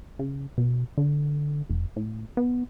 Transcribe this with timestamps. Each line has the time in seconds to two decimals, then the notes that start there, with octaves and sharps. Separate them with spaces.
0.19 C#3
0.58 B2
0.98 D3
1.69 F1
1.96 A2
2.37 B3